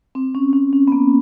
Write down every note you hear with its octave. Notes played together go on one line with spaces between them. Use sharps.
C4
C#4
C#4
C#4
B3
A#3